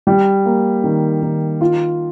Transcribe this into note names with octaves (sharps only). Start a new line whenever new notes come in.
G3
A#3
D#3
D#3
F4